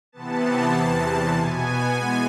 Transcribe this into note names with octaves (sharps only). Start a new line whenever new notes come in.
C3 E3 B3 A5
E2 C3 E3
B2 B3 G#5
E3 G#3 B3